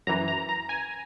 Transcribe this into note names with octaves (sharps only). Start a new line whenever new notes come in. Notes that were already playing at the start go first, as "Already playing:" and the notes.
F#2 E3 A#5
A#5
A#5
G#5